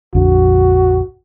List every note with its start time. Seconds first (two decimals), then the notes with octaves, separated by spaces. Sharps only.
0.15 A#1 F2 D3 F#4